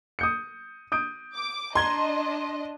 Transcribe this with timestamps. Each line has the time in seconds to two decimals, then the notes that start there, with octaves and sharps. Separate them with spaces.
0.19 D#6 G6 C#7
0.92 D#6 G6 D7
1.36 D6
1.75 D4 D#5 A#5 C6 G#6 G7